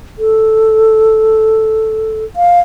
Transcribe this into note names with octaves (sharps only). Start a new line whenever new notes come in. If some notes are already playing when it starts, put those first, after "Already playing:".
A4
F5